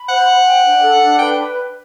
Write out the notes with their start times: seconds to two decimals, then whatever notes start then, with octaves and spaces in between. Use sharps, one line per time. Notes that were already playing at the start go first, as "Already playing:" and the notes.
Already playing: B5
0.09 C5 F#5
0.27 C5
0.45 G5
0.64 D4
0.82 A4
1.01 D4
1.19 B4 G5